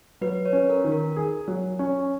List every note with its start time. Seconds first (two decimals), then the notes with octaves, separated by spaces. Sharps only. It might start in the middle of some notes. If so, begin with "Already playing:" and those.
0.21 F#3 B4
0.45 C#5
0.53 C#4
0.70 A#4
0.84 D#3
0.92 A#4
1.16 G#4
1.48 F#3
1.79 C#4